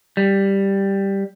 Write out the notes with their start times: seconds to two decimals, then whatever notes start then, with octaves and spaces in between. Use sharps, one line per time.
0.17 G3